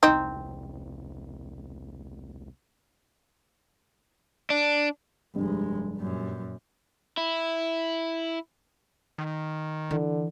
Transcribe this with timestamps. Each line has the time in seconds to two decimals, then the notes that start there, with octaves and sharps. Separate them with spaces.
0.03 E1 C2 C4 D#4
4.50 D4
5.36 F1 G2 G#3
5.97 F#2 A#2
7.17 E4
9.18 D#3
9.91 D3 E3